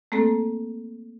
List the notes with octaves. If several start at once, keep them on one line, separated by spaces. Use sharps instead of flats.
A3 A#3 C4 A4